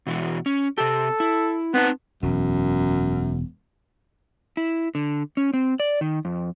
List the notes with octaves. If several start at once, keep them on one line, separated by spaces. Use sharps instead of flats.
B2 E3 F#4
C#4
C3 G4 A4
E4
B3 C4 D#4 A5
E1 F#2
E4
D3
C#4
C4
D5
D#3
F2